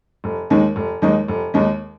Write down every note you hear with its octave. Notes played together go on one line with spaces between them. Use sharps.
F1
D#2 D#3 G#3 D#4
F1
D#2 D#3 G#3 D#4
F1
D#2 D#3 G#3 D#4